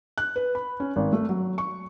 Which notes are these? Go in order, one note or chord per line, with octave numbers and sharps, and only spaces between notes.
F#6
B4
B5
C#4
G#1
A3
F#3
C#6